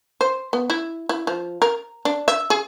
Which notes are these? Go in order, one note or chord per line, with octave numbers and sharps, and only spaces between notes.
C5
B3
E4
E4
F3
A#4
D4
E5
G#4